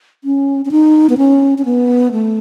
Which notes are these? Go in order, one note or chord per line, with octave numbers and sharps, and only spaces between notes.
C#4
C#4
D#4
B3
C#4
C#4
B3
A3